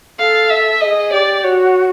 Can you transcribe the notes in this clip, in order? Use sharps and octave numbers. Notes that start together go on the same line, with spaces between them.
A4 F5
E5
G#4 A4 D#5
G4 D5
F#4 C#5